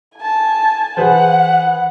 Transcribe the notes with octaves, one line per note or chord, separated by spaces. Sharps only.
G#5 A5
E3 G#4 B4 C5 F#5